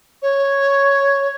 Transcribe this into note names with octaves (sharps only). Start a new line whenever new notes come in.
C#5